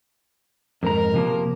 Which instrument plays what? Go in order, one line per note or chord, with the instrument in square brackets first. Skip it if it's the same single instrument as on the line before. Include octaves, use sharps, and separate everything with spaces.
[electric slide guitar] F2 G#2 A#5 [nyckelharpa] A#4
[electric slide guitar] C3 F3 A#3